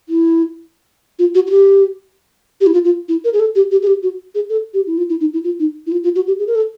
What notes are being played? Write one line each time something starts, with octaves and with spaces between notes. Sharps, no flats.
E4
F4
F#4
F#4
G4
G4
E4
F4
F4
E4
A#4
G#4
A4
G4
G4
G#4
G4
F#4
G#4
A4
G4
E4
F4
E4
D#4
E4
F4
D#4
E4
F4
F4
F#4
G4
G#4
A#4
A4